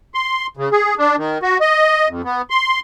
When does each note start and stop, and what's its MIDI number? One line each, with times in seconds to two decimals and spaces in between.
0.14 0.47 84
0.57 0.69 49
0.72 0.94 68
0.98 1.16 62
1.18 1.38 51
1.43 1.57 66
1.61 2.08 75
2.09 2.22 41
2.24 2.42 59
2.50 2.80 84